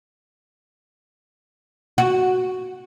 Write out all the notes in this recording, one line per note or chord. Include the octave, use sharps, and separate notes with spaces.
F#4